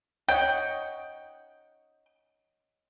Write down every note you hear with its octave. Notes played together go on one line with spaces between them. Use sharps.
C#5 D#5 F#5 G5